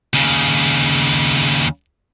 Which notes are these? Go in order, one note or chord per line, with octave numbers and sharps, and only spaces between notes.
D#2 C#3